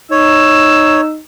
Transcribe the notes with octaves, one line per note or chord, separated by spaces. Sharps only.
D#4 C#5 E6